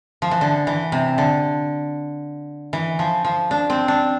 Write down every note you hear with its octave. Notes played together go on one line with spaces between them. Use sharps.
F3
E3
D3
E3
C3
D3
E3
F3
F3
D4
C4
D4